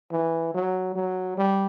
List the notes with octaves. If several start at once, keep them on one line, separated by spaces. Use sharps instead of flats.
E3
F#3
F#3
G3